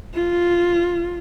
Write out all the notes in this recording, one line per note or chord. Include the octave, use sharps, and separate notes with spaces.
F4